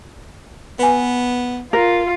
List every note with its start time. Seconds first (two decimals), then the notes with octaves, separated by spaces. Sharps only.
0.79 B3 B4 G#5
1.73 F4 A#4